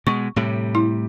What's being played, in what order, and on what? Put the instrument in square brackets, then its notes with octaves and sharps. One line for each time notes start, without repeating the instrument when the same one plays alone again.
[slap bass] B2 G#3 [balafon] C#6
[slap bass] A2 C3 G3
[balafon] E4